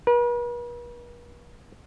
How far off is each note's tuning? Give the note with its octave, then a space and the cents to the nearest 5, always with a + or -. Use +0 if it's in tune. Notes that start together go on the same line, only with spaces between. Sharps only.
B4 -45